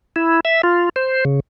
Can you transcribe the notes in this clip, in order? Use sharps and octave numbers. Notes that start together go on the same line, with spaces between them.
E4
E5
F4
C5
C#3